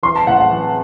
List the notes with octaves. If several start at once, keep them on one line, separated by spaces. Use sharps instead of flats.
E3 C6
A5
A2 F#5
F#5
E3